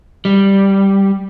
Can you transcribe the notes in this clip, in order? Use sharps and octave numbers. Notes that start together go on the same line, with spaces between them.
G3